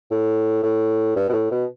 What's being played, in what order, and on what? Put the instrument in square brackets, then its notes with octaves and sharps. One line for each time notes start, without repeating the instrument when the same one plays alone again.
[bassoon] A2
A2
G2
B2
A2
B2